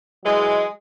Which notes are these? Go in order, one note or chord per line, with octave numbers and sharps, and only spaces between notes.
E3 F#3 G#3